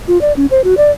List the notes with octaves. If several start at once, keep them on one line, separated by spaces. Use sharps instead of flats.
F4
D5
C#4
C5
F#4
D5